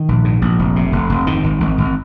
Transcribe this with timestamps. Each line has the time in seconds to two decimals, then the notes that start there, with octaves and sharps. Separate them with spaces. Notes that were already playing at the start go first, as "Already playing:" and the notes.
Already playing: D#3
0.08 A#1
0.24 G#2
0.42 A#1
0.59 F1
0.76 C3
0.92 F1
1.09 F1
1.27 G#2 D#3
1.44 G#1
1.60 G#1
1.78 G#1